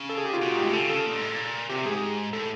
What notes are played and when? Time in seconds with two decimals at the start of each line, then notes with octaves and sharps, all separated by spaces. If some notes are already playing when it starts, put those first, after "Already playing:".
Already playing: C#3
0.09 A4
0.18 G#4
0.25 G4
0.33 F4
0.42 B2 F#4
0.49 A#2
0.57 G#2 G4
0.65 A2
0.73 C#3 A4
0.89 C#3 A4
1.06 A#2
1.13 G#2
1.21 A2
1.30 A#2
1.69 C3 G4
1.85 G#2 G#4
2.33 A2 A4